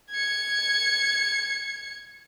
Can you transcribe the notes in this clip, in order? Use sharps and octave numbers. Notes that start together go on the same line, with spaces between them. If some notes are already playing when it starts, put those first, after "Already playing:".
G#6 C#7